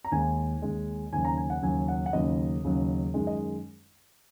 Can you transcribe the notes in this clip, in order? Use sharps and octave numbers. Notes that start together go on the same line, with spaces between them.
A#5
D#2 D#3 G#3 G#5
D#2 D#3 G#3
D#2 C#3 F#3 G#5
A#5
G#5
F#5
D#2 C#3 F#3 G#5
F#5
F#5
D#2 C#3 F#3 D#5
D#2 C#3 F#3
F#2 D#3 G#3
D#5